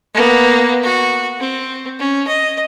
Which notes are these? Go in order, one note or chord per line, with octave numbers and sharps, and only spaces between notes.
A#3 B3
F#4
C4
C#4
D#5